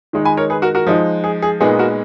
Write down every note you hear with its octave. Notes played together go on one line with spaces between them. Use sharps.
D#3 G#3 D#4
G#5 B5
A#4 C#5
G#4 B4
F#4 A#4
F#4 A#4
F3 G#3 D#4
G#4
G#4
A#2 G#3 B3 D#4 G#4
F#4 A#4